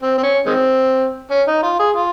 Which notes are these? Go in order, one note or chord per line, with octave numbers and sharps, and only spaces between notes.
C4
C4
C#4
D#3 G#3 C4
C#4
D#4
F4
G#4
F4